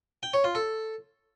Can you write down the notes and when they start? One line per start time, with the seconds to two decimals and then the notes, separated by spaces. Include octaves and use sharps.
0.23 G5
0.34 C#5
0.44 F4
0.55 A4